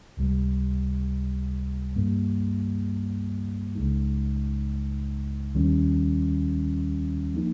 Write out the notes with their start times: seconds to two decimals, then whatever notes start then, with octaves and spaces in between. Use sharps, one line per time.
0.17 C#2 C3 G3
1.96 G2 G3 A#3
3.75 C#2 C#3 G#3 D#4
5.54 D#2 D#3 G3 C#4
7.34 F3 A#3 D#4